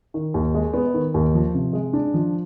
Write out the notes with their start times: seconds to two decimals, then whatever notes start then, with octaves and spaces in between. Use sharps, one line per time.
0.14 D#3
0.34 D#2
0.54 G#3
0.74 B3
0.94 D#3
1.14 D#2
1.34 F3
1.54 C3
1.73 G#3
1.93 D4
2.14 F3